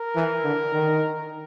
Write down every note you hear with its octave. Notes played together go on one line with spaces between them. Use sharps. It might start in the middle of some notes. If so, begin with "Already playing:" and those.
Already playing: A#4
E3
D3
D#3